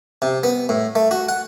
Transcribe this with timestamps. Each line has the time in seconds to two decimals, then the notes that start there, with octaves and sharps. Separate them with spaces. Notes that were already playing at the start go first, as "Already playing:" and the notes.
0.22 C3
0.43 B3
0.69 A2
0.95 A3
1.11 F#4
1.29 F#5